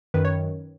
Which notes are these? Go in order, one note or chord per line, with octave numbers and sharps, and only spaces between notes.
F#2 D#3 B4
C#5